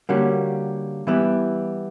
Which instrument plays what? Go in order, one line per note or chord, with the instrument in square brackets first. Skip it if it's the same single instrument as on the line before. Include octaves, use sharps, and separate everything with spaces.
[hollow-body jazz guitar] D3 G3 A#3 C#4 F#4
E3 G3 B3 E4